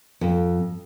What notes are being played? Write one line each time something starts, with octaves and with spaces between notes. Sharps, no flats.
F2